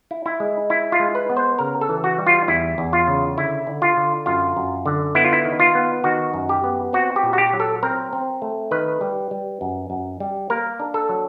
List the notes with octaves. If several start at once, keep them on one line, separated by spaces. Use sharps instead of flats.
E4
E4
G#3
E4
F4
G#3
B4
B3
C5
C#3 A#4
A4
E3
F#4
G3
F4
E2 E4
E2
F4
C#3
D3 E4
D3
F4
D3
F#2 F4
F#2
D3
B3 E4
F4
E4
D#3
F4
B3
D#3 F#4
F#2
G4
B3
C4 F#4
G4
A#2
F#4
G4
F#3
A4
C4 A#4
C4
A3
D#3 B4
G3
G3
F#2
F#2
G3
A#3 A#4
D4
A4
F#3